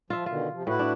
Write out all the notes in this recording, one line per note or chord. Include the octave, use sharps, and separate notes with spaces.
F3 F4 E5
B2 D3 D#3 F4
C3 F3
A2 E4 F#4 B4
D4